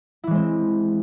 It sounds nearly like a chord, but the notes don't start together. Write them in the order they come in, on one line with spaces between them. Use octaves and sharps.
E4 E3 G#3 C4